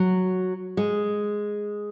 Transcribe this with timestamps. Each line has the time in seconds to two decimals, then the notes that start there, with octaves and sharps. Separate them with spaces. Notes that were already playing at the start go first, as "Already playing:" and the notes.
Already playing: F#3
0.77 G#3